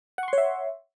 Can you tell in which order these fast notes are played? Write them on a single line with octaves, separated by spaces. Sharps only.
F#5 C#6 C6 C#5 E5